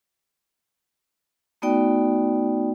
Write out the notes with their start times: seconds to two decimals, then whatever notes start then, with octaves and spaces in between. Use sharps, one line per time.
1.62 A3 B3 D#4 F#4 D5 G5